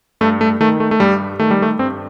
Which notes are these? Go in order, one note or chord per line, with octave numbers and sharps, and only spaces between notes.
G2 A3
A3
D#3 A3
A3
A3
G2 G3
D#3 A3
G3
A3
G2 C4